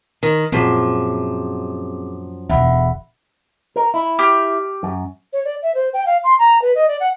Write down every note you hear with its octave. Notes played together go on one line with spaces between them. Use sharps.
D#3
F#2 A#2 F3 C4 G#4 D6
E1 D3 E5 F#5 B5
A#4
E4
G4 F6
F#2
C#5
D5
E5
C5
G5
F5
C6
A#5
B4
D#5
D5
F#5